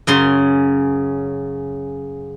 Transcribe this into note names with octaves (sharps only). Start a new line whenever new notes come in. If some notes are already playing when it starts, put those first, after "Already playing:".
F#2 C#3 C6